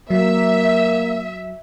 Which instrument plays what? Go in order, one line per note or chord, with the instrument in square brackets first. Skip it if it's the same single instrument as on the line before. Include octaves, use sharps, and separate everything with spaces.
[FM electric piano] F#3 [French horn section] A#3 [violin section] E5